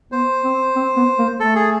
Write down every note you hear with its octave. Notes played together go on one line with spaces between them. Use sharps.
B3 C5
C4
C4
B3
A#3
A3 A4
G#4